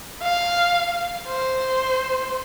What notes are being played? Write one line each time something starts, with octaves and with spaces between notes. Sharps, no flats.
F5
C5